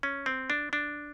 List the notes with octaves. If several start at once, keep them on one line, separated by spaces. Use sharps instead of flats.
C#4
C4
D4
D4